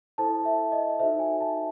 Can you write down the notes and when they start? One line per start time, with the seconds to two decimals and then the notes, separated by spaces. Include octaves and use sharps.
0.18 E4 A4 C5 A5
0.45 E5
0.72 D#5
0.99 D#4 F#4 A4 C5 E5
1.19 G#5
1.41 A5